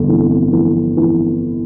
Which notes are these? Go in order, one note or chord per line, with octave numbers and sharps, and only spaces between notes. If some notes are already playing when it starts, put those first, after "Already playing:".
Already playing: G1 F2
E3
E3
E3